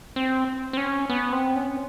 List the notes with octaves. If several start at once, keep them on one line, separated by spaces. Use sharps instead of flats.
C4
C4
C#4
B3
C4
C#4